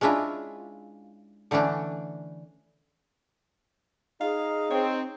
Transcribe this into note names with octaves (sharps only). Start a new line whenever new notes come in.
G#3 C#4 D4 E4 F4
D3 E3 A3 C#4 D4
D#4 G#4 F5
C4 C#5